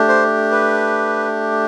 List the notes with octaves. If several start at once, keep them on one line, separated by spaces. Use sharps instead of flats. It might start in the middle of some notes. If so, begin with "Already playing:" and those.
Already playing: A3 D4 G4
C5
B4